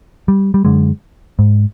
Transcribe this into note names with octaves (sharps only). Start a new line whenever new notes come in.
G3
G3
F#2 D3 G#3
G#2